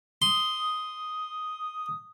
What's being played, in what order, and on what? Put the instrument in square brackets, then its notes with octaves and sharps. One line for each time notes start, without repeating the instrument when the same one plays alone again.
[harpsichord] C6 [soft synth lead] D#6